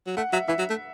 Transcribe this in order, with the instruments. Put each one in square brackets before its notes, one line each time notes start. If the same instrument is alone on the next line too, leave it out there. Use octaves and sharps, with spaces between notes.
[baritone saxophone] F#3
[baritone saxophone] A3 [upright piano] F#5
[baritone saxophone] F#3 [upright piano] E5
[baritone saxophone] E3 [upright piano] E5
[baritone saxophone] F#3
A3